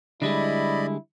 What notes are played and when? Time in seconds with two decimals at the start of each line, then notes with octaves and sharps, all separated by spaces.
0.22 D3 G3 G#3 E4 D5 D#5 B5